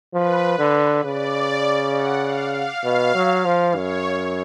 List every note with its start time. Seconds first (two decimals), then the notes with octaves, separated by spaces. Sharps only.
0.13 F3 B4
0.59 D3
1.04 C#3 D5
1.94 F#5
2.24 F5
2.54 F5
2.84 B2 F5
3.15 F#3
3.45 F3
3.75 F#2 C#5